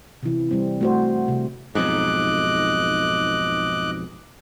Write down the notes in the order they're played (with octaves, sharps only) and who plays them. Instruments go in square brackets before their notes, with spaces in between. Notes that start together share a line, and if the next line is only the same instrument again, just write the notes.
[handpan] C3 E3
G3 C4
A3 F#4 C5
C3
[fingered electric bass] B1 F2 G#2 [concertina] D#5 D6 F#6